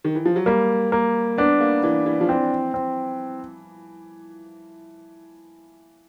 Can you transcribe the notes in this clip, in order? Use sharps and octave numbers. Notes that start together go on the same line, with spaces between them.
D#3
E3
F3
F#3
G3 A#3
A#3
B3 D4
A#3
E3 D4
E3
F3
E3 C4
C4